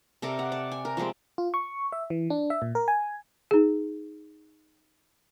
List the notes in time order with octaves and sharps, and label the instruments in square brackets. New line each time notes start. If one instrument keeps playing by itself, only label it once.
[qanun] C3 A4 A#4 D5
F#5
D5 A5
G#5
A#4
F3 G3 G#3 C4
[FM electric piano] F4
C#6
E5
E3
D4
E5
A#2
A#4
G#5
[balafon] D#4 G#4